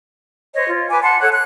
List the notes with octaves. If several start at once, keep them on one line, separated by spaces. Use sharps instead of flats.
C5 C#5 D#5
F4
B4 G#5 D6
F#5 A5 C6
A4 C#5 F#5 F#6
F#6